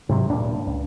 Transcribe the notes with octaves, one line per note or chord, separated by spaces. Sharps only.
G#2 C3 D#3 F#3
D#1 G2 A#2 D4
C#2